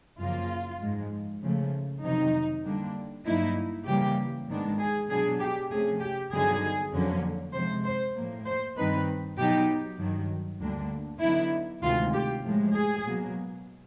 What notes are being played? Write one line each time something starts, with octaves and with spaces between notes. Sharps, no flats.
F#2 C#3 F3 A#3 F4
G#2 F3 G#3
C#3 F3 A3
F2 C3 D#3 F#3 D#4
D3 G3 A#3 D4
G2 D3 F#3 A#3 D#4 E4
C#3 E3 G3 A#3 G4
G#2 D#3 G#3 B3 D4
G#4
B2 F#3 B3 D4 G#4
G4
C3 F3 A3 C#4 G#4
G4
G2 D3 F#3 B3 D#4 G#4
F2 D3 F#3 A#3 C#4
C3 F3 G#3 C5
C5
A2 F3 A#3
C5
G2 D#3 G3 C4 D#4 B4
B2 F#3 B3 D#4 G4
G2 D#3 F#3
D2 D3 G3 A#3 D4
D3 F#3 B3 D#4 E4
D2 C3 D#3 G#3 F4
G4
A2 F3 G#3
G#4
B2 F#3 A#3